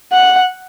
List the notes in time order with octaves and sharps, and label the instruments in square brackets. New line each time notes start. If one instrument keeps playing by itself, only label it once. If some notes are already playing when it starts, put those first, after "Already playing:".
[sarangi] F#5